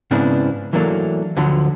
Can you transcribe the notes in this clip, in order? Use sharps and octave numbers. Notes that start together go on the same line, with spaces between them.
G#2 C#3 B3 C4 D4 E4
E3 F#3 A3 A#3 D4
D2 D3 F3 F#3